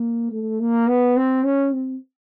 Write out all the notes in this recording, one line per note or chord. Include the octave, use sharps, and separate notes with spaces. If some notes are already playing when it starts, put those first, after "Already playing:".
Already playing: A#3
A3
A#3
B3
C4
C#4
C4